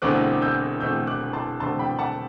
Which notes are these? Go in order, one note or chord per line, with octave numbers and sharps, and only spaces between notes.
E1 E2 D3 A3 C4 D6 F#6
E6 G6
E1 E2 D3 A3 C4 E6 G6
D6 F#6
A5 C6
E1 E2 D3 A3 C4 A5 C6
G5 B5
F#5 A5